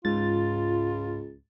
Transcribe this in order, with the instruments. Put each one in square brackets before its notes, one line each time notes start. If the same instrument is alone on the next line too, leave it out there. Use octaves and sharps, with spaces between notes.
[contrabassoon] C#2 [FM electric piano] G#2 A6 [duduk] F4